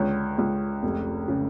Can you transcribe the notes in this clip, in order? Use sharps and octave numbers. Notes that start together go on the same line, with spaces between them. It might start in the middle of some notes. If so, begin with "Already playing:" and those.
Already playing: C#2 D3 C#5
C#2
F1
C#3